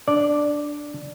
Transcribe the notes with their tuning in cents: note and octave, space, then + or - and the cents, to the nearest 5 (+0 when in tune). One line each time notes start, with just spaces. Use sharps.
D4 +0 D5 +0